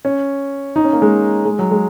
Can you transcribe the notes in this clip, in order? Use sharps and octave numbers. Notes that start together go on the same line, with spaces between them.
C#4
D#4
C#4
A#3
G#3
G#3
F#3
G#3